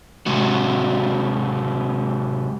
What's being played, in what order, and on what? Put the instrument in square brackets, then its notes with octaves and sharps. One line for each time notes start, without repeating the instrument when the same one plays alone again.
[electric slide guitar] C3 F#3 G#3 F#4